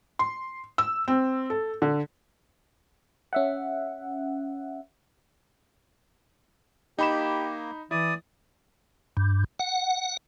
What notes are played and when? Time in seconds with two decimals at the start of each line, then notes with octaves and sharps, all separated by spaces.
0.19 C6
0.78 E6
1.08 C4
1.50 A4
1.82 D3
3.33 C#4 E5 F#5
6.99 A#3 D#4 G4 B5 E7
7.91 E3 E4 D5 D#6
9.17 G2
9.59 F#5